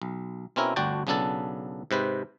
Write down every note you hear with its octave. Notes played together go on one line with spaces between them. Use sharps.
B1
B2 C4 C#4 E4 A#4
G1 D2 D4 F#4 G5 A5
B1 C#3 B3 D4 A4 A5
G#2 C3 B4 C5